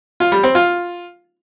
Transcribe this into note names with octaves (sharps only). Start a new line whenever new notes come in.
F4
G3
C4
F4